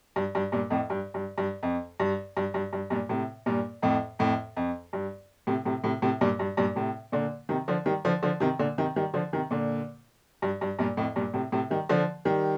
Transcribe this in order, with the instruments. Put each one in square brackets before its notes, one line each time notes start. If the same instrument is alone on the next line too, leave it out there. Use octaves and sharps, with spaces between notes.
[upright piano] G2
G2
G2 A#2
F2 A2
G2
G2
G2
F2
G2
G2
G2
G2
G2 A#2
A2 C3
G2 A#2
F2 A2
F2 A2
F2
G2
A2 C3
A2 C3
A2 C3
A2 C3
G2 A#2
G2
G2 A#2
A2 C3
A#2 D3
C3 D#3
D3 F3
D#3 G3
D3 F3
D3 F3
C3 D#3
A#2 D3
C3 D#3
D#3 G3
D3 F3
C3 D#3
A#2 D3
G2
G2
G2 A#2
F2 A2
G2 A#2
A2 C3
A2 C3
D#3 G3
D3 F3
D#3 G3